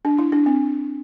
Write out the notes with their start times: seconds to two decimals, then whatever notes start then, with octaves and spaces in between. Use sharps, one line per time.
0.05 D4
0.18 E4
0.32 D4
0.46 C4